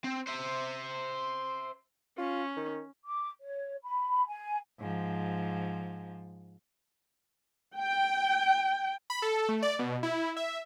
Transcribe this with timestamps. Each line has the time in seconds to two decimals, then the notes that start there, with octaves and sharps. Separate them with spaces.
0.04 C4
0.27 C5 E5
2.18 C#4 F4
2.56 D#3
3.05 D6
3.41 C#5
3.83 B5
4.26 G#5
4.80 G#2 F3
7.77 G5
9.10 B5
9.22 A4
9.49 A3
9.62 D5
9.79 B2
10.03 E4
10.36 E5